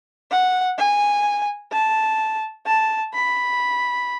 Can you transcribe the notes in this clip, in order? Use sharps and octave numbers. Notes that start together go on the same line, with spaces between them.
F#5
G#5
A5
A5
B5